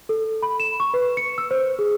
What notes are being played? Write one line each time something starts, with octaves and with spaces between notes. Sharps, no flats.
A4
B5
E7
C#6
B4
C#7
E6
C5
G#4